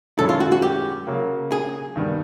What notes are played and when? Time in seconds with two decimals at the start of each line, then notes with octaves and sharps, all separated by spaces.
0.18 F#2 D#3 G#3 C#4 E4 A4
0.29 F4
0.40 F#4
0.52 F#4
0.62 G4
1.07 C#3 F#3 A#3
1.52 G#4
1.96 G2 D#3 G3 B3